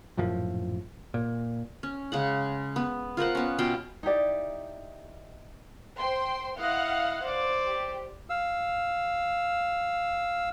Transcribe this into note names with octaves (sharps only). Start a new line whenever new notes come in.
A#1 F#2 A2 F3
A#2
C#4
C#3 G#3 F#5
B3
F4 A#4 C5 F#5
B3 C#4
B2 F4 G5
D#4 E4 G4 D5
C5 G5 C6
E4 D#5 F5 F#5
C5 D5
G4
F5 E6